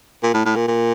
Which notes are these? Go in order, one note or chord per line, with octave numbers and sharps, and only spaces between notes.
A#2
A2
A2
A#2
A#2